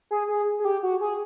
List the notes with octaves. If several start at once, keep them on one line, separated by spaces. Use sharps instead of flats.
G#4
G#4
G#4
G4
F#4
G#4